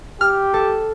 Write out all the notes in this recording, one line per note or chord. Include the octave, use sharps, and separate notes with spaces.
G4 F6
A4